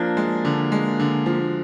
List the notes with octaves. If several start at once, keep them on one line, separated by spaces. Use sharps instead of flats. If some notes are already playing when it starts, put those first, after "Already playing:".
Already playing: F3 A#3 D4
G#3
D3
G#3
D3
F3